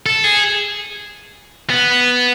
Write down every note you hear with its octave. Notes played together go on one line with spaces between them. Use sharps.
A4
G#4
B3